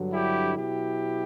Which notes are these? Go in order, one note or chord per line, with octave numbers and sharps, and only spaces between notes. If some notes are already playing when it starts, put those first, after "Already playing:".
Already playing: G2 D3 F#3
E4 G4
B2 F#3 E4 G4